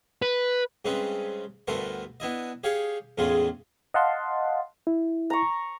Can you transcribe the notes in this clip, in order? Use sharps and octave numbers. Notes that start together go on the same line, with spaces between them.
B4
G2 C#3 G#3 C4 C#4 B4
D2 G2 A3 B3 A#4 C5
B3 D4 E4 D#5
G4 G#4 C#5 F5 G5
E2 A2 C#3 G#3 F4 G#4
D#5 F5 F#5 A5 C6
E4
A#5 C#6